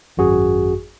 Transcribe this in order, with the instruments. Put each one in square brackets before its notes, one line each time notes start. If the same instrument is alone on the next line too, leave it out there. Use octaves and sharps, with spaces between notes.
[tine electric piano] G#1 F#2 F#4 G#4